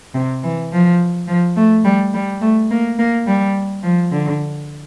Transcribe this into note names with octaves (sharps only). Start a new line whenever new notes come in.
C3
E3
F3
F3
A3
G3
G3
A3
A#3
A#3
G3
F3
D3